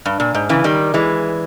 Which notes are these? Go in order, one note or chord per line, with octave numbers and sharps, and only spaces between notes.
G2
A#2
G#2
C#3 E3
D#3 G3
E3 G#3